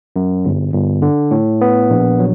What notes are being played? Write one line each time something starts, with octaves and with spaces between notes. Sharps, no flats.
F#2
G1
G1
D3
A2
B3
A#1
F#3